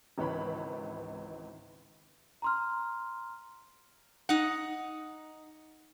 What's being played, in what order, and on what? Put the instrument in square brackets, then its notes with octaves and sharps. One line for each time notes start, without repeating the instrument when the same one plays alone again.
[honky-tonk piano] G#1 C#2 E3 C#5 B5
[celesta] A#5 C6 F6
[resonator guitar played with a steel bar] D#4 F#5